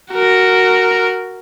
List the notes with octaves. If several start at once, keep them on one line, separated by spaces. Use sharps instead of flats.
F#4 A#4